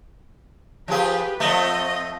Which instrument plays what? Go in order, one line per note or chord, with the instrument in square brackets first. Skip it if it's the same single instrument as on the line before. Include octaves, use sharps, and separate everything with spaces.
[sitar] F3 F4 G#4 [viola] G4 B4
[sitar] F3 A3 [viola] C4 D#5